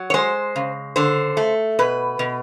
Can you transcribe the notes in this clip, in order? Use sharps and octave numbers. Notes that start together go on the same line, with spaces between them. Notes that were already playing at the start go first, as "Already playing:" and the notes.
Already playing: F#3
C#5
G#3 C5
C#3
D3 C5
A3
B2 B4
B2